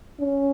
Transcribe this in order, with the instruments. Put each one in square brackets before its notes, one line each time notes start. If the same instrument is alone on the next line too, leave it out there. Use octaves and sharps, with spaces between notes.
[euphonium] C#4